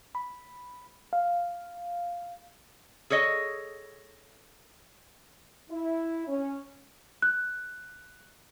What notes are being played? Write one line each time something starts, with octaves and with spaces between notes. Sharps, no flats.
B5
F5
G#4 A4 C#5 D#5
E4
C#4
F#6